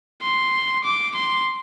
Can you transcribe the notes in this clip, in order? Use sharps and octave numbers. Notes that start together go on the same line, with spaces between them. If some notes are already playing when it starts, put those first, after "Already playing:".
C6
D6
C6